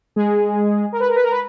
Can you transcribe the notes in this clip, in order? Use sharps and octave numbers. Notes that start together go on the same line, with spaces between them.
G#3 G#4
A#4
B4
A#4
B4
A#4
B4